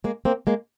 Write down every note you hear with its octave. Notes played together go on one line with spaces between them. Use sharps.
G#3 A#3
A#3 C4
G#3 A#3